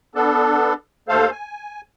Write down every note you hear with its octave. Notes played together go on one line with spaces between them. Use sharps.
B3 D4 A4
D#2 A3 A4 C5 F5
G#5